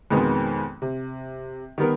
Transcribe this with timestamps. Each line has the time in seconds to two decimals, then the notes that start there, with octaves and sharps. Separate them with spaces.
0.11 F2 B2 D#3 G#3 B3
0.82 C3
1.78 D#3 G3 B3 A#4